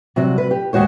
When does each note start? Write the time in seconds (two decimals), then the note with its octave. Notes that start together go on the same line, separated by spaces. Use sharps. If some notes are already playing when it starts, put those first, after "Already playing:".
0.16 C3 F#3 G3 F#4
0.38 B4
0.51 G4
0.73 D#2 G#3 F#4 C5 C#5